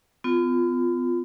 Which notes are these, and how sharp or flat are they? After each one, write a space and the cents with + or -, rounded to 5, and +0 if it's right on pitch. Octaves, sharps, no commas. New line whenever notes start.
B3 +40 F4 +0